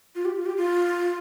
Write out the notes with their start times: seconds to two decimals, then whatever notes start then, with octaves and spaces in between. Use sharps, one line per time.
0.15 F4
0.25 G4
0.36 F4
0.46 G4
0.57 F4